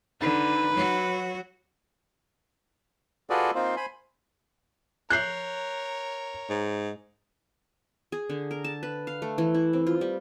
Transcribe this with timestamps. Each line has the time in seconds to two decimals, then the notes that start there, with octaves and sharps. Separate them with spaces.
0.21 D3 D#4 B4
0.73 F#3 F#4
3.30 F4 F#4 G#4 A4 B4 D5
3.55 A#3 C4 D#4 F4 C5
3.76 C5 G#5 B5
5.10 A#4 C#5 F#6 G6 C7
6.50 G#2
8.12 G#4
8.29 D3
8.51 A#4
8.64 A5
8.83 B4
9.07 F5
9.22 A3
9.38 E3
9.54 E4
9.73 C4
9.87 F4
10.01 G3